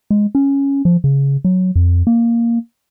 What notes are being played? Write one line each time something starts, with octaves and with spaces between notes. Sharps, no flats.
G#3
C#4
F3
C#3
F#3
F2
A#3